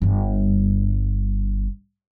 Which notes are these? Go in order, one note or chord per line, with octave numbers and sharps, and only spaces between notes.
G1 G2